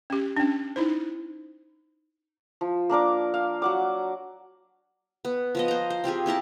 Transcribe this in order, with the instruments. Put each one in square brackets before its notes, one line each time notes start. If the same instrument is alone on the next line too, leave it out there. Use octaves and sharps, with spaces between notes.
[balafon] C#4 G4
C#4 D4
D#4 E4 C5
[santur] F3
A#3 D4 A#4 D6
F5
F#3 F#5 D6
[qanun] B3
F3 B3 D#5
C5 A#5
C5
C4 F4 G4 G#4
C4 E4 A#4 A5